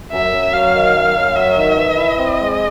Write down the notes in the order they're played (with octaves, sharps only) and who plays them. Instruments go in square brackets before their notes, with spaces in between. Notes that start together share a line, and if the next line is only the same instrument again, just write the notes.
[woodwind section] F#2 [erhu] E5
[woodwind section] F#2
[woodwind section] F#3 [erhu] F5
[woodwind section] D#3
F#2
F#2
[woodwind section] F#3 [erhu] E5
[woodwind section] D#3
E3
E4
[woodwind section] C4 [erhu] D#5
[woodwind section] G#3